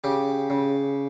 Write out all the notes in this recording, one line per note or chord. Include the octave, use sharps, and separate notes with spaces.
C#3 G4
C#3